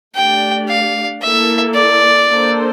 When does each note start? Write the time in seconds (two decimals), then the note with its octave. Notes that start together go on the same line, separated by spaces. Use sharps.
0.15 A3 D4 G4 D5 G5
0.69 F5
1.22 A#3 E4 A4 E5
1.75 D5
2.28 A#3 D4 A4 C5